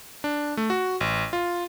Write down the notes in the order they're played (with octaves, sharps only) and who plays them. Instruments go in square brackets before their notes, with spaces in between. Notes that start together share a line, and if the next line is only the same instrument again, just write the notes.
[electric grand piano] D4
A3
F#4
A1
F4